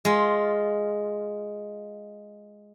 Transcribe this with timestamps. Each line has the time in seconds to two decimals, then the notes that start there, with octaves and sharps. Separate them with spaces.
0.05 G#3 F4